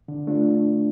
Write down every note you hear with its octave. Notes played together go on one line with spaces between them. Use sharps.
D3
A3 D4 F4